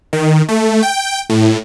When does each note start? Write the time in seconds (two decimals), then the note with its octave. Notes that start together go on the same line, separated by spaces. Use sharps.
0.13 D#3
0.49 A3
0.83 G5
1.30 A2